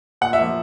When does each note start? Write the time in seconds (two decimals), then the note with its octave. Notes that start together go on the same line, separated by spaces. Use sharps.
0.21 A#2 F#5
0.33 E5
0.39 F3 A#3